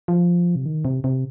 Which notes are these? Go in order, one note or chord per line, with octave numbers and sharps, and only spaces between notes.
F3
C3
D#3
C3
C3